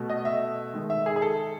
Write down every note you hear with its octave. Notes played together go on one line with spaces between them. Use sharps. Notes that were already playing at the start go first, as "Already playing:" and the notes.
Already playing: B2 A3
D#5
E5
D#3 G#3
E5
G#4
G#4
A4